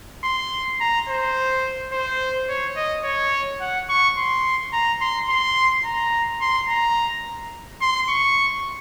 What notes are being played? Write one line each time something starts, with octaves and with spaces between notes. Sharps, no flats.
C6
A#5
C5
C5
C#5
D#5
C#5
F#5
C#6
C6
A#5
C6
C6
A#5
C6
A#5
C6
C#6